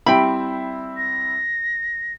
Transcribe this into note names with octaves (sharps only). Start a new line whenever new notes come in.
G3 C4 E4 G5 B5
A#6